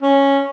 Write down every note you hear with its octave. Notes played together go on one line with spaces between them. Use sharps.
C#4